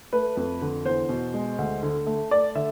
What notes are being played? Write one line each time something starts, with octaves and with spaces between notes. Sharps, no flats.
A3 B4
F2
D3
E2 C5
B2
G#3
D2
D3
A3
A3 D5
D3 E5